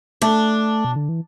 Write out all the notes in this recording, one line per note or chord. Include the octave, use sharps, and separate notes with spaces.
A3 D4
B2
D3
E3